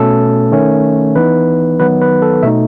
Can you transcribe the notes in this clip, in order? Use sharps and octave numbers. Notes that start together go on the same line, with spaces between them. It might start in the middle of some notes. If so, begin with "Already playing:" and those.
Already playing: B2 A3 C#4 A4
D#3 A3 C#4
E3 B3 D#4 B4
D#3 F#3 B3 D#4 B4
B4
A4
B2 A3 D#4 E5